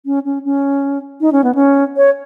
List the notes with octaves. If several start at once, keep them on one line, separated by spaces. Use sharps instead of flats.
C#4
C#4
C#4
D#4
C#4
B3
C#4
C#5